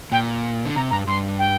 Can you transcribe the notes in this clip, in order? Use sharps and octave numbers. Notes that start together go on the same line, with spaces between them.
A#2 G5
D3
C3 A#5
G2 A#5
G2 C6
G5